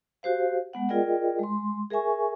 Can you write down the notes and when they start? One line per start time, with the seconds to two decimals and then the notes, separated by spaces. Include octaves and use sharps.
0.23 F#4 G4 C5 F5
0.73 G#3 B3 F#5
0.89 F4 G#4 A#4 D5 D#5 G5
1.39 G#3 C6
1.90 G#4 A#4 E5 G#5 C#6